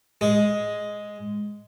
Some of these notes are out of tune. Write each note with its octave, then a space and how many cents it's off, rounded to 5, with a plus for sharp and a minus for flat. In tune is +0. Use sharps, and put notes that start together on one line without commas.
G#3 +0 G#4 +10